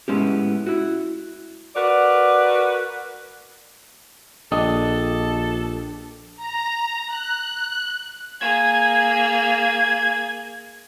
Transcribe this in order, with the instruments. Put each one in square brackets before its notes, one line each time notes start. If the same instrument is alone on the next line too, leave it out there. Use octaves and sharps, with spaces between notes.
[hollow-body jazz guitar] A2 G#3 B3 C#4 E4 G4
E4 F#4
[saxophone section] F#4 A#4 B4 D5
[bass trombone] A#1 [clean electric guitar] D4 G4 D#5 [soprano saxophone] A4
[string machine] A#5
F#6
[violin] A#3 G#4 [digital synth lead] G#6